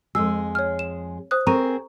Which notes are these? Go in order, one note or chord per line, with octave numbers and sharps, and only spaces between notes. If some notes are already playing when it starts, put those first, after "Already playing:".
F2 G#3 G#4 E6
C#5 F6
E7
C5 D#6 F#6
C4 G#4 A#4 A#5 C#6 D#7